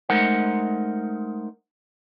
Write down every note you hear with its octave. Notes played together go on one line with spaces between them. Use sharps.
G#3 A3 D#4 A#4 C5 F#5